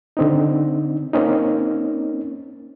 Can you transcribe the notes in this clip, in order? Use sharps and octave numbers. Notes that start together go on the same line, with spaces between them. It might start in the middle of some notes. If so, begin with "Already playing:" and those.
D3 C4 D#4
A#3 C4 C#4 D#4